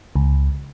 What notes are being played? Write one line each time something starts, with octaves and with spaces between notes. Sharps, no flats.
C#2